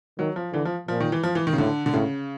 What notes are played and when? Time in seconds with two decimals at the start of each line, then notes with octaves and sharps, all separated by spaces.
0.19 D#3 F#3
0.36 F3
0.53 D3 E3
0.65 F3
0.88 A#2 F3
1.00 D#3
1.12 E3
1.23 F3
1.35 E3
1.47 D#3
1.53 C#3
1.58 A2 D3
1.86 D3
1.93 A2 C#3